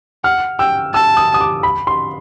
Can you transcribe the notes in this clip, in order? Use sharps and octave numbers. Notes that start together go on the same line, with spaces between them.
F#5 F6
G5 E6
A5 E6
D#6
D#6
D6
B5
C6